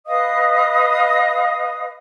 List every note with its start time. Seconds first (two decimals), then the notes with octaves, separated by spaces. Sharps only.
0.07 B4 D#5 F5 D#6